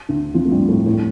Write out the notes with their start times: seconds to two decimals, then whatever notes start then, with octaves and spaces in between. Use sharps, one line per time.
0.09 D2 D3
0.34 F2 F3
0.45 A3
0.51 G2 G3
0.69 A2 A3
0.86 A2 A3